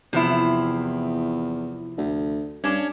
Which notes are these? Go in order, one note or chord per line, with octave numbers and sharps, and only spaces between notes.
E2 C3 F3 E4
D2
G2 C#4 D4